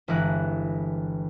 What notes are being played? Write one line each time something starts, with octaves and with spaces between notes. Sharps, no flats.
G1 E3 G#3 F#6